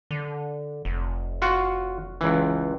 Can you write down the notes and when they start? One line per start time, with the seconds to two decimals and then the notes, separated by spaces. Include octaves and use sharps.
0.11 D3
0.85 F1
1.42 F4 F#4
2.21 C#2 E3